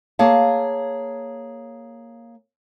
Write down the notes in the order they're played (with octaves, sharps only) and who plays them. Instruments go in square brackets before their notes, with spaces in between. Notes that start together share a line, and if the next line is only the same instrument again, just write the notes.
[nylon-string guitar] A#3 G#4 C#5 F5 A5